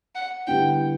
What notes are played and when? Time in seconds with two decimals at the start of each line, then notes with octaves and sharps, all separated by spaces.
0.15 F#5
0.47 D3 G3 B3 E4 G5